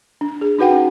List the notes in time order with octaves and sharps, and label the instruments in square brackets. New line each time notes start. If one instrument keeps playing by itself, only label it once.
[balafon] D4
G#4
D#4 F#4 B4 F#5 G5
C#4